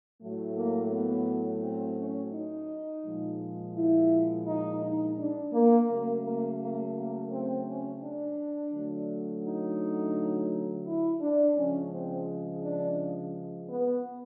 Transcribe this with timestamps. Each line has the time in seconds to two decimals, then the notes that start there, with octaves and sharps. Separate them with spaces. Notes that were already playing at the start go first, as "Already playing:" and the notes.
0.20 A2 F#3 A3
0.56 A#3
0.90 B3
1.62 C4
1.97 C#4
2.32 D#4
3.03 A#2 F3 G#3
3.74 E4
4.45 D#4
4.81 D#4
5.16 D4
5.52 A#3
5.87 C#3 F#3 A3 A#3
6.23 A#3
6.58 A#3
6.94 A#3
7.29 C4
7.65 C#4
8.00 D4
8.71 D3 F#3 A3
9.42 D#4
10.84 E4
11.20 D4
11.54 C#3 F3 G#3 C#4
11.90 C4
12.62 D4
13.68 B3